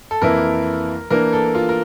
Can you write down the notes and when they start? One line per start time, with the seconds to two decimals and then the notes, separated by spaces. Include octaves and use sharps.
0.11 A4
0.22 F2 E3 A#3 E4 A4 A#4
1.10 E3 A#3 D4 A#4
1.33 A4
1.55 F4
1.69 A#4